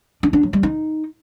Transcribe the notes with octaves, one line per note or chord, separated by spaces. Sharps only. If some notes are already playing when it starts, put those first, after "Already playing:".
D4
D4
F#3
G3
D#4